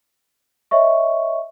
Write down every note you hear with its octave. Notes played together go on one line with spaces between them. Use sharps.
C#5 D#5 E5 C#6